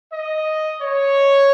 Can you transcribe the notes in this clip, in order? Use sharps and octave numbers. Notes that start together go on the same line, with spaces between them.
D#5
C#5